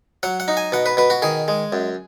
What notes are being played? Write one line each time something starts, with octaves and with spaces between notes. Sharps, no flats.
F#3 F#5
F#5
D#4
G#5
B2 F#5
B4
B2 B4
F#4
D#3 G#4
G#3
F#2